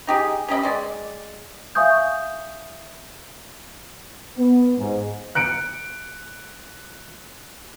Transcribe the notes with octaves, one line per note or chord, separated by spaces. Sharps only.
D#4 G4 G#4
C#4 G4 D#5 B5
G#3 D5
E5 F5 G#5 C#6 D#6 G6
B3
G#2
F#6 C#7 D7